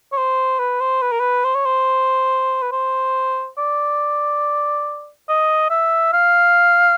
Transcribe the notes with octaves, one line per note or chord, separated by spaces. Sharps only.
C#5
C5
B4
C5
B4
A#4
B4
C5
C#5
C5
B4
C5
D5
D#5
E5
F5